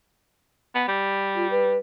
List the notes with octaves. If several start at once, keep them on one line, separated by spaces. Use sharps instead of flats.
B3
G3
F4
B4